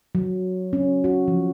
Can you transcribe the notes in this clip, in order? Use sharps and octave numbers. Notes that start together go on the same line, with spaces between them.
F#3
C#4
F#4
F3